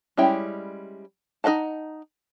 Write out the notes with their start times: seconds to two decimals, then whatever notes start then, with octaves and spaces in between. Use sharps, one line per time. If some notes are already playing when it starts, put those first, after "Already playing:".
0.17 G3 G#3 C#4 E4 G5
1.44 D#4 A#4 D#5 F#5 A5